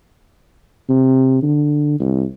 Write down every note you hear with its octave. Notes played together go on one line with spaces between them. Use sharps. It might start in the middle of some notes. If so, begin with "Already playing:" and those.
C3
D3
C2